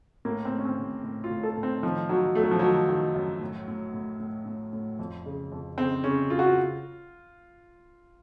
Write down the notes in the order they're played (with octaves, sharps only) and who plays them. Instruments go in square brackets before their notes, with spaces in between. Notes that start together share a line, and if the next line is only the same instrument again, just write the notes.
[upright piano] A2 A#3
C4
A2
C#4
C4
A2
A2
F4
A2
A4
A2
C4
D#3 F3
D#3 F#3
F#2 A3
F#3
F3
D#3 F#3
D#3
F#2
A2
A2
A2
A2
A2
A2
F2
C#3
F2
C#3 C4
C#3 C#4
C#3 F4
F#4
F4